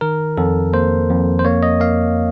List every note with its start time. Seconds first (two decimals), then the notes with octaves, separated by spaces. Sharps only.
0.01 D#3 A#4
0.38 F2 A4
0.73 A#3 C5
1.09 F2
1.39 C5
1.45 A#3 C#5
1.63 D#5
1.80 A#3 F5